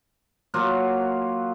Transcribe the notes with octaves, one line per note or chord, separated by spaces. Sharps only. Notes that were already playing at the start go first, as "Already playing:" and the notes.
F#3 A#3 F4 F#4